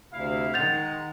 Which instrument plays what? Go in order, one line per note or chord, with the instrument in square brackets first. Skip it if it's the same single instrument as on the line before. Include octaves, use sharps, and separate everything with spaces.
[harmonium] D2 C3 [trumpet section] E4 F5
[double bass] D#3 [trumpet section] G#3 [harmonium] F#5 [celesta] G6 A6 F7